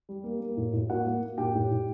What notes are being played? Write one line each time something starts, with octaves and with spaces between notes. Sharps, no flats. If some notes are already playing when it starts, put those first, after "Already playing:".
G3
A#3
A#3
A2
A2
A#3 F#4 F#5
A#3
A#3
A2 G4 G5
A2
A2